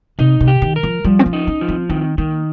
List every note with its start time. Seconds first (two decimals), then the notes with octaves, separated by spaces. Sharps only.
0.19 C3 D#4
0.40 C3
0.48 G4
0.62 D#3
0.76 A#4
0.83 F3
1.04 F3 G3
1.19 C4
1.26 C#4
1.33 D#4
1.47 C#4
1.61 F3
1.68 C4
1.89 D#3 C4
2.18 D#3 A#3